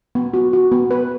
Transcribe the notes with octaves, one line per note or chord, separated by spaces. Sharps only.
B3
F#4
F#4
B3
B4